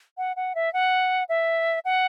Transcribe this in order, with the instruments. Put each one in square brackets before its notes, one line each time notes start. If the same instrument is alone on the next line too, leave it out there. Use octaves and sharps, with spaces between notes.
[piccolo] F#5
F#5
E5
F#5
E5
F#5